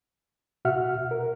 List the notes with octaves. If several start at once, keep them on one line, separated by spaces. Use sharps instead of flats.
B2 F#4 E5 F#5 F6
A#4